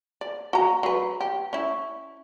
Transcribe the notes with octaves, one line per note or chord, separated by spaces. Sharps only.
D5
F#4 A#5
F#3 B4
G4
C#4 E4